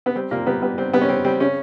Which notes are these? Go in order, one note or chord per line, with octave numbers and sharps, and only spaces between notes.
B3
G3 C4
A#2 A#3
G3 B3
G3 B3
G3 C4
G3 B3
C#4
G3 C4
G3 C4
C#3 C#4